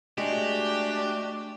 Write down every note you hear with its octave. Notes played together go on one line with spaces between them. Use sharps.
G#3 A3 D4 F#4 G4